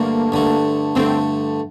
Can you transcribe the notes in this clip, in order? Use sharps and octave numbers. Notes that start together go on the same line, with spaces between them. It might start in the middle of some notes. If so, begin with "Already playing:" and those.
Already playing: G2 D3 A3 A#3
G2 D3 A3
G2 D3 A3 C4